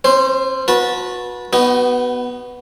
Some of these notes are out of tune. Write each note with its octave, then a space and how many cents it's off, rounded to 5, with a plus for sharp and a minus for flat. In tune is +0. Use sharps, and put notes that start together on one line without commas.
C#4 -45 C5 +0
F#4 -25 B4 -25 A5 +0
B3 +0 D#4 -20 F#4 +30